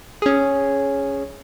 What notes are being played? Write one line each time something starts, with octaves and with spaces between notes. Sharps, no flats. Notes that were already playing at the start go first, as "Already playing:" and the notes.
C#4 G#4